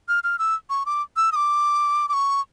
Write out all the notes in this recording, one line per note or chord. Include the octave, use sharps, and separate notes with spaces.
F6
F6
E6
C#6
D6
E6
D#6
D6
D6
C#6